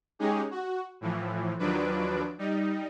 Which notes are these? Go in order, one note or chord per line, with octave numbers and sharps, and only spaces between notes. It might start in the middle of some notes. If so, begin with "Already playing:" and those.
G#3 C#4 D#4 G4 G#4
F#4
A2 E3 F3
D#2 F3 F#3 D4 B4 D7
G3 D#4